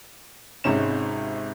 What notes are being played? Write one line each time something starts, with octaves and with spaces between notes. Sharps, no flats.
G#1 G#2 C3 C#4 E7